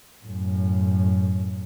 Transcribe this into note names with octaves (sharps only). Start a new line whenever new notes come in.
F#2 A2